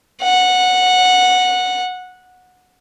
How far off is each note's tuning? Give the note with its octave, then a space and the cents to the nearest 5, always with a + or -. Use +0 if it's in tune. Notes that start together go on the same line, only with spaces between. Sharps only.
F#5 -15